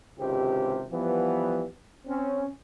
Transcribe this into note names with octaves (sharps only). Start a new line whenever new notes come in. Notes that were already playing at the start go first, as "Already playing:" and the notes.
G#1 C#2 C3 G4 C5
E3 F3 G3 B3
C4 C#4